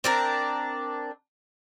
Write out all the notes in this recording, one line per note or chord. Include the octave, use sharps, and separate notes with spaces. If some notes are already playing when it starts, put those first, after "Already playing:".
C4 D4 A#4